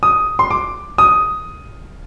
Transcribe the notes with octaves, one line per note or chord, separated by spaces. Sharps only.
D#6
C6
D6
D#6